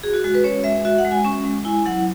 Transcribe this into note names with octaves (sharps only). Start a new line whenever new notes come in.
F#4 G#4
F#4
G#3 F#4
B4
C#4 C#5
G#3 E5
F#4 E5
F#5
G#3
G#5
C#4 C#6
G#3
E4 G#5
F#3 F#5